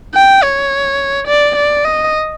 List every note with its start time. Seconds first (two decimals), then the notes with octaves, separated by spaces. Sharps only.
0.15 G5
0.44 C#5
1.28 D5
1.56 D5
1.85 D#5